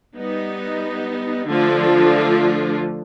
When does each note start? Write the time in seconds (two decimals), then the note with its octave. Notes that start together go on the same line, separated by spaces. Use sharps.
0.17 G3 B3 D#4
1.47 D3 F3 A3 D4 F4